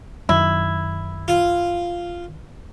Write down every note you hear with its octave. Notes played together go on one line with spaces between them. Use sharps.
F#2 D#3 E4
F4